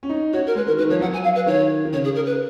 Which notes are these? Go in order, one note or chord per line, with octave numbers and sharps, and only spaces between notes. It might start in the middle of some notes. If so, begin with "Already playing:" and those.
C#4
D#4
F#4 C#5
A#4
G#3 B4
D#3 A#4
D#3 B4
F3 C#5
F#3 F#5
G#5
F5
B4
D#3 C#5
D#3
C#3 C#5
G#4
A#4
B4